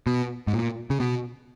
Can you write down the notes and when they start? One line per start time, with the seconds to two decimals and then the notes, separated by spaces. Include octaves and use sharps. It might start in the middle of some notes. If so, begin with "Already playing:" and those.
0.07 B2
0.47 G#2
0.53 A#2
0.90 C#3
1.00 B2